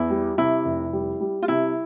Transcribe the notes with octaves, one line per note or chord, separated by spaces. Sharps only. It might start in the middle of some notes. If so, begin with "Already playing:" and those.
Already playing: E2 E4
G3
C3 E4
F1
G3
G3
F4
C3 E4